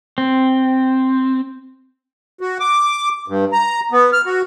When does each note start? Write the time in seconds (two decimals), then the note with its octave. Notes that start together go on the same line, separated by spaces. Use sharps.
0.18 C4
2.41 F#4
2.60 D6
3.28 G2
3.52 A#5
3.92 B3
4.13 F6
4.26 F#4